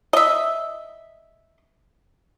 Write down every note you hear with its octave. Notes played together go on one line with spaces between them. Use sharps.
D#5 E5